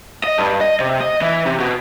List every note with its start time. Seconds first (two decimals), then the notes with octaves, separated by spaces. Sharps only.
0.24 D#5
0.38 G2
0.61 D#5
0.80 C3
1.01 D#5
1.22 E3
1.46 C3
1.60 B2